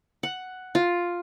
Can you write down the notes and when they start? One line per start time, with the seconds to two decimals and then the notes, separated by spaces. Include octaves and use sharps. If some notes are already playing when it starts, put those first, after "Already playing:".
0.23 F#5
0.75 F4